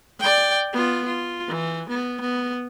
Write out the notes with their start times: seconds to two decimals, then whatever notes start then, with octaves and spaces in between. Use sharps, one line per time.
0.19 D5 G5
0.73 B3 F4
1.06 F4
1.48 E3
1.89 B3
2.21 B3